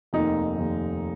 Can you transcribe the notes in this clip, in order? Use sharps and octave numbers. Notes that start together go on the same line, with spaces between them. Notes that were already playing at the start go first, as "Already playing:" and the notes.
F1 D#2 D#3 D#4
F1 D#2 D#3